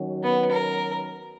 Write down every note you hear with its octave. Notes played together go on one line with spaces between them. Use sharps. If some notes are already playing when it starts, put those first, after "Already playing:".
Already playing: D#3 F#3 C#4 F#4
B3
A#4